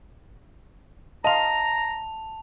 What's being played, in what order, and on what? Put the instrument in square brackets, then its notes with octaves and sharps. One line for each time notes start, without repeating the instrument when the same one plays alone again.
[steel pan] D#5 F5 C6 [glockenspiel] A5 F7 [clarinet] A#5